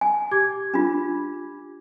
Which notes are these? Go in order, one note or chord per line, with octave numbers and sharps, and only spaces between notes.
G#5
G4 D6 G#6
D4 F4